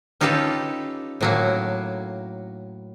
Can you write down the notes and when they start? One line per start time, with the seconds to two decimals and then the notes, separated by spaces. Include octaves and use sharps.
0.21 C#4 D#4 F4 G4 A4 B4
1.21 A2 F#3 A#3